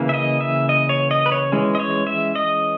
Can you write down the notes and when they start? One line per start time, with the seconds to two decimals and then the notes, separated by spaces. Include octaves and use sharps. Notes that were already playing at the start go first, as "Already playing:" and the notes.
Already playing: C#3 E3 A#3
0.09 E5
0.14 D#5
0.41 E5
0.69 D#5
0.89 C#5
1.11 D#5
1.26 B4
1.32 C#5
1.52 E3 G#3 C#4
1.75 D#5
1.80 C#5
2.07 E5
2.35 D#5